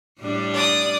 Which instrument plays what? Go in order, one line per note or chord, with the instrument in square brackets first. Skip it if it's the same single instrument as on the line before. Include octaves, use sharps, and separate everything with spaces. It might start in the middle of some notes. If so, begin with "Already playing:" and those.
[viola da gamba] A2 G3 D4
[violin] D5 D#6